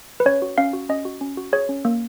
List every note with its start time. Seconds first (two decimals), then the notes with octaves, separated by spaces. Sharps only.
0.20 B4
0.25 C#4 C#5
0.42 F#4
0.58 C#4 F5
0.73 F#4
0.89 C#4 D#5
1.05 F#4
1.21 C#4
1.37 F#4
1.53 G#4 C#5
1.69 C#4
1.85 A#3